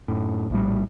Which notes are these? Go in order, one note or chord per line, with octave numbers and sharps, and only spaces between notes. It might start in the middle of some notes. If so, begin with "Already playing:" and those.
F#2 A2
A#1 A2 G3